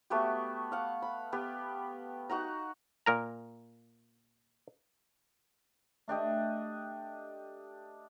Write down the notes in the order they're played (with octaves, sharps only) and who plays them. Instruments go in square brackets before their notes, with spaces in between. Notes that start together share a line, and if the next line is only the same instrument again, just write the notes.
[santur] A3 B3 F#4 G4
F5 F#5
B5
B3 G4
D#4 F#4 F#5 A#5
[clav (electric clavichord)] A#2 A#4 A#5
[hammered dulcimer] A3 D4 G4 D#5